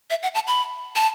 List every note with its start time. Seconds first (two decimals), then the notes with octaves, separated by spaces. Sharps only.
0.10 E5
0.23 F#5
0.35 A5
0.47 B5
0.96 A5